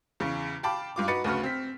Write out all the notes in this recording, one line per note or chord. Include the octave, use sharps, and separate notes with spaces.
E2 C#3
F5 G5 A5 B5 D6
G2 F4 D6
D#4 F#4 B4 D6 A6 C#7
D2 C#3 F#4 B4 F6
C4 B6